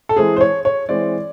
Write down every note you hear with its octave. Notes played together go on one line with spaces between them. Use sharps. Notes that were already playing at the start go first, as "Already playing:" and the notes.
A4
E3 G#3 C4 G#4
C5
C#5
C#5
E3 G#3 C4 D5